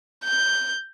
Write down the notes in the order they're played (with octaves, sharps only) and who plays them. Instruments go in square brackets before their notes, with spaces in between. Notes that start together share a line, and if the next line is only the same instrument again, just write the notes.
[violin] G6